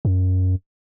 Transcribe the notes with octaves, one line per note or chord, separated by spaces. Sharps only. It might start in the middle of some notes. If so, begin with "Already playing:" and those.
F#2